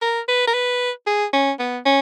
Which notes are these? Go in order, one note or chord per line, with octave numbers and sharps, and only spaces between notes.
A#4
B4
A#4
B4
G#4
C#4
B3
C#4